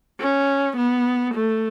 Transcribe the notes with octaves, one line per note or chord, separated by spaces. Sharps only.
C#4
B3
A3